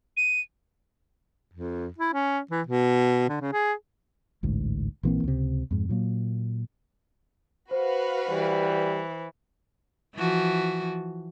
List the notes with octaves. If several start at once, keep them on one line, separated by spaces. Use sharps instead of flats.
D#7
F2
E4
C#4
E3
B2
D3
C#3
G#4
A1 D2 G#2
A#1 E3 A#3 C4
C#2 C3
F2 G#2
A#2 F#3 A#3
F#4 B4 C5 F5
E3 G3
E3 F3 F#4